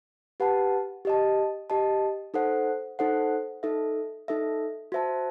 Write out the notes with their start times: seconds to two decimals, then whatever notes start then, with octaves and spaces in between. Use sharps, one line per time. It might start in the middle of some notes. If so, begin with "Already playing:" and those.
0.40 G4 B4 F#5 A5
1.05 G4 D#5 A5
1.70 G4 D#5 A5
2.34 D#4 A4 C5 F#5
2.99 D#4 A4 C5 F#5
3.63 D#4 A4 E5
4.28 D#4 A4 E5
4.92 F#4 C5 E5 A5